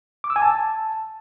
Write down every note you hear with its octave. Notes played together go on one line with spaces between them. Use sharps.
D6
E6
G#5
A5